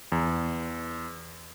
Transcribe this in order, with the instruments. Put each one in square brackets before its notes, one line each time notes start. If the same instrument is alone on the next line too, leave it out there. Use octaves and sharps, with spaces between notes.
[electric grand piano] E2